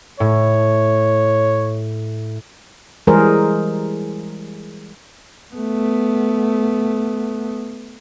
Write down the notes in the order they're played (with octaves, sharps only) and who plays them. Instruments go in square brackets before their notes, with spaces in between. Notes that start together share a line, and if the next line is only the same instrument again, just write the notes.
[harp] A2 [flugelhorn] C#5
[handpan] E3 G3 G#3 G#4 A#4 C5
[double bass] A3 B3